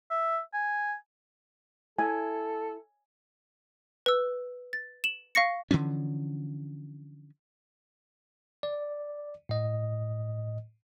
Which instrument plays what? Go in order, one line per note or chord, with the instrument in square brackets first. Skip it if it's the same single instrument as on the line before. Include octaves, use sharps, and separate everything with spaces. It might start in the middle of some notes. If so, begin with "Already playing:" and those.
[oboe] E5
G#5
[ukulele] E4 [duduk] A4 [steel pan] G#5
[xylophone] B4 E6
A6
E7 F#7
F5 C#6 A#6 C#7
[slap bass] D3 E3 F3 C#4
[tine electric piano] D5
A2 D#5